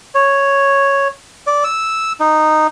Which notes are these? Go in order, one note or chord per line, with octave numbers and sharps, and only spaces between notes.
C#5
D5
E6
D#4